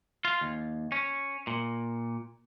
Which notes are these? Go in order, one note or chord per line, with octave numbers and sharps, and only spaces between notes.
F4
D#2
C#4
A#2